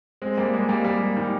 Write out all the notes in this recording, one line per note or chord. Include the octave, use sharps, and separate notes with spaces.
G#3 C4
G3 A#3
G#3 C4
G3 A#3
G3 A#3
D#3 G3